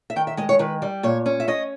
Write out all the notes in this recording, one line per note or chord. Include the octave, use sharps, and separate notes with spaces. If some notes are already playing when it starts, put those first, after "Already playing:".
E5
D#3 G5
E5
G#3 D#5
C#5
D#3 B4
G3
A#2 C#5
C#4
E5
C#4 D#5